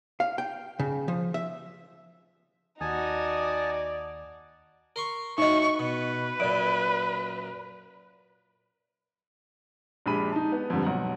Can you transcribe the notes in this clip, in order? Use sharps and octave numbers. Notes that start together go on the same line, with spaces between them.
F5
G5
C#3
F3
E5
D#2 D#4 F#4 D5 G#5 A5 D#6
A#4 C6 C#6
A2 D#4 F#4 D#5 C#6
B2 B4
F#2 A#2 D5 D7
A#1 G#3 D4 G4 B5 D#7
D#4 A5
B3
F2 G#2 D3 G3
B1 F#5